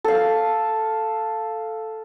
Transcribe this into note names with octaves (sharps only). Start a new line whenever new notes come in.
A4 F5